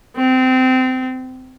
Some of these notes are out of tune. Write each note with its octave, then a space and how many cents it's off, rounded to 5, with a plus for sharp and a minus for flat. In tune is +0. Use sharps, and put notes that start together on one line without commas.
C4 -25